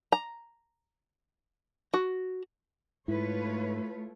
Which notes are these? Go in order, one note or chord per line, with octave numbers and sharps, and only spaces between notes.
A#5
F#4
G#2 A3 E4 F4 B4 C#5